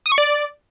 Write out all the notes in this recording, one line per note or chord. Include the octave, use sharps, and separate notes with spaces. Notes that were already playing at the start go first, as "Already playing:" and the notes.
D#6
C#6
D5